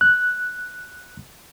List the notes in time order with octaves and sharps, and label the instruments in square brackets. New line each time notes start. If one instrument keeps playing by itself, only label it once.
[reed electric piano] F#6